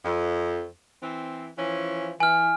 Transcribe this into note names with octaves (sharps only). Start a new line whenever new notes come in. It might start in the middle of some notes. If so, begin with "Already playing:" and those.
F2
E3 C4
E3 F3 C#4
E3 G#5 F6